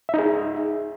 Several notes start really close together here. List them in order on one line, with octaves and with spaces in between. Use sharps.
E5 D#4 G#4